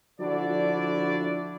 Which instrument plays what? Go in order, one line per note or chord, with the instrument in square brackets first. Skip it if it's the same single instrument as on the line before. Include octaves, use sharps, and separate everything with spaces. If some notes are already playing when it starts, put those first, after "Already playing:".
[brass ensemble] D3 F3 D4 E4 F#4 D5